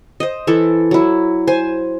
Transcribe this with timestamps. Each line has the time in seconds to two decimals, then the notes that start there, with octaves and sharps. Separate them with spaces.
0.20 C5 D#5
0.47 E3 E4 A4
0.91 F#3 E4
1.48 C5 G#5